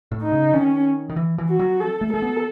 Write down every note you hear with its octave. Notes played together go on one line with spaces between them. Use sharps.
A2
D#4
C#3
D#3 C#4
D#3
E3
E3
F#4
F#3
A4
A3
A3 A4
B3